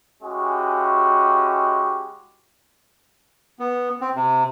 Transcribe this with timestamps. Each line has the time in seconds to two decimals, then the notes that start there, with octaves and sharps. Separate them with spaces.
0.23 G#3 C#4 E4 F#4 G4
3.59 B3
4.01 C4
4.16 C3